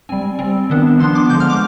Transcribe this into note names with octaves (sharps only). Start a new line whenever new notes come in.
G3 C4 G#5
G3 C4
D#3 B3 D4
F3 B3 D4 C6
D6
D3 F3 G#3 G6
F6
D6